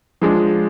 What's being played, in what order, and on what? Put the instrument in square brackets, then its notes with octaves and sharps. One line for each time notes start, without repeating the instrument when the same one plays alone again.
[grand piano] F3 G#3 D4